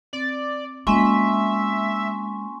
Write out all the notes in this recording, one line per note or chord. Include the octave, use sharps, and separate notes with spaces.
C4 D5
G#3 A#3 C#4 F4 E5 G#5 C6 C#6